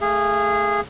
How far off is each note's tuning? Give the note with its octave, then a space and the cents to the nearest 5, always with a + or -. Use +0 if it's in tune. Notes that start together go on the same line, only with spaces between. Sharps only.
A3 +0 G#4 -15 F5 -35